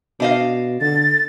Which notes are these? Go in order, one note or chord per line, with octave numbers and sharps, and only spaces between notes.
B2 D4 D#5 F5
D3 A6